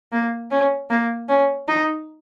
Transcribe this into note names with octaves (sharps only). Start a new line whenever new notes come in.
A#3
C#4
A#3
C#4
D#4